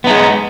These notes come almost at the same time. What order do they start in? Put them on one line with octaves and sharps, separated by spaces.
B3 D#4 G#3